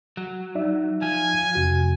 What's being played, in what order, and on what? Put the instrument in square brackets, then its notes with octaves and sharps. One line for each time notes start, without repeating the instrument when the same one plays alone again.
[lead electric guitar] F#3
[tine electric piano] D#4 D5 E5
[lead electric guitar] F3 [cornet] G#5
[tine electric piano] F2 C3 F#4